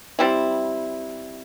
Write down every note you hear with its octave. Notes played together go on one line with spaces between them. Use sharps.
G3 C4 E4